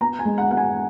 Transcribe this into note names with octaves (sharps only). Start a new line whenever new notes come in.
B3 A#5
G#5
G#3
F#5
B3 F#5
G#5